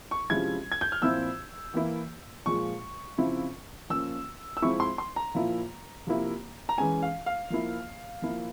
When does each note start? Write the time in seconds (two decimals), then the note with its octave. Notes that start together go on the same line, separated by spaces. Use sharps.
0.11 C#6
0.30 C3 F3 G#3 C#4 E4 G#6
0.72 G#6
0.81 G6
0.92 F6
1.01 A#2 F3 C4 E4 E6
1.74 E3 A#3 E4
2.46 A#2 F3 G#3 C#6
3.18 C#3 F3 C4 E4
3.90 F3 A#3 C#4 E6
4.57 E6
4.62 F3 G#3 C4 E4 C#6
4.80 C6
4.98 C6
5.16 A#5
5.34 A#2 F3 A#3 E4
6.07 C3 F3 A#3 E4
6.69 A#5
6.78 E3 G#3 C#4 G#5
7.02 F5
7.26 F5
7.50 F3 A#3 E4
8.22 F3 A#3 E4